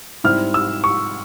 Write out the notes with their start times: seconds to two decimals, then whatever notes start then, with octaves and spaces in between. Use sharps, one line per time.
0.24 G#2 G3 C4 E4 F6
0.54 E6
0.84 C#6